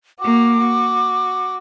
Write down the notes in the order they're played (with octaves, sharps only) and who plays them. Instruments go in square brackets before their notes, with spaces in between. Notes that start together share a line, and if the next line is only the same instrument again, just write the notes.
[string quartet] A#3 F#4 [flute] D6
[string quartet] F#4